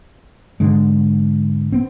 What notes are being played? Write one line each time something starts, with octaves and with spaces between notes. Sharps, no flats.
G#2 D3 G#3
B3 C4